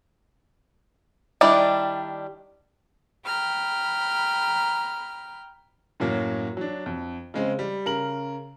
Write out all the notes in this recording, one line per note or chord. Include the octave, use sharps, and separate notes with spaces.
D#3 G3 D4 E4 D5
G5 A#5 B5 F6
F#2 A2 F#3 A#3
F#3 D4
F2
C#3 G#3 C4
G3
C#3 A#4 F#7